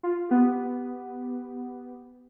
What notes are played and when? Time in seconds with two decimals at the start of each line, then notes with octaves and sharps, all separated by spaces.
0.03 F4
0.29 B3 G4